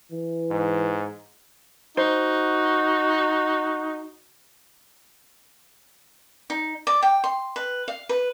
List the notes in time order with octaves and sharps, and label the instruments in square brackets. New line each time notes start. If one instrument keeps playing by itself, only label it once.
[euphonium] E3
[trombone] G#2
[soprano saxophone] D#4 [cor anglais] F#4 [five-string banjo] C5
[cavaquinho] D#4
D5
G5
C6
B4
F5
B4